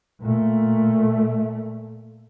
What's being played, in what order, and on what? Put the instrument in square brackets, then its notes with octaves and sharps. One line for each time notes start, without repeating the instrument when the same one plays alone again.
[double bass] A#2 A3